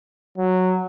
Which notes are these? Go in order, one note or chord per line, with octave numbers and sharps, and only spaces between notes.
F#3